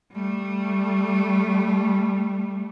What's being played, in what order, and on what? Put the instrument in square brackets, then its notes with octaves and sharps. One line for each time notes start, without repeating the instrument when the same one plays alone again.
[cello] G3 A3